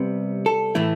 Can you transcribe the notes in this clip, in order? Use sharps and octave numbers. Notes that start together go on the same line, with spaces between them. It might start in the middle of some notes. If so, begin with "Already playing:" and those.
Already playing: C3 G3 B3
A4
A2 E3 A3 E4